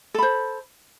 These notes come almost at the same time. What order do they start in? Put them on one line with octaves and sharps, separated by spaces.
A4 B5 C5